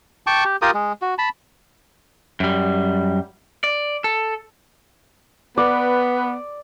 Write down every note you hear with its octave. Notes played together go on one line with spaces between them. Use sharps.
G5 A5 C#6 D6
G4
F4 G4 A#4 D#6
G#3
F#4
A5 B5
F#2 G3
D5
A4
B3 B4 D5